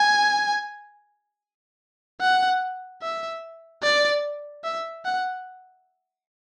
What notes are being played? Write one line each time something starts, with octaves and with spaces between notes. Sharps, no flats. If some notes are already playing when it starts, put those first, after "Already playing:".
Already playing: G#5
F#5
E5
D5
E5
F#5